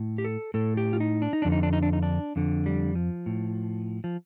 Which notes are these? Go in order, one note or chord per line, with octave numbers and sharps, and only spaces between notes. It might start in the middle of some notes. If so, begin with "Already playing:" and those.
Already playing: A2
G4
A4
A2 A4
G4
F4
D#4
D4
D#4
F2 D3 D4
D#4
D4
D#4
D4
D#4
D4
F2 D3
G3
F3
A2
F3